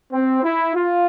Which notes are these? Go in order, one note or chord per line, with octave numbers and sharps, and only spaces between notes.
C4
E4
F4